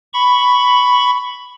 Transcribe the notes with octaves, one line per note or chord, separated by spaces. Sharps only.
B5 C#6